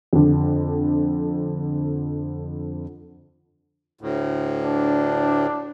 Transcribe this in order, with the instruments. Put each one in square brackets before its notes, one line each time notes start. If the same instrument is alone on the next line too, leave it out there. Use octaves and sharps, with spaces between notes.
[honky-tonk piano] F2 D3
[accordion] D2 A2
[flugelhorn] D4